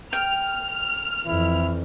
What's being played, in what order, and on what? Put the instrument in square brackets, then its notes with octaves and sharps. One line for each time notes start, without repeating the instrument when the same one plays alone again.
[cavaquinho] G5 [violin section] F6
[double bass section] F2 E3 [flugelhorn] E4